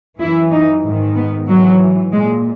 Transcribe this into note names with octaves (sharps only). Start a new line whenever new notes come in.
F#2 E3 E4
D#4
G#2 D#3
B3
G#2 E3 F#3
A#2 G#3